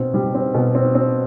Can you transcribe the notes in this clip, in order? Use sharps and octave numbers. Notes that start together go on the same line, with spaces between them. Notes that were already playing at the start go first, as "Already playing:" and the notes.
Already playing: B2 C4
G3
C4
B2
C4
C4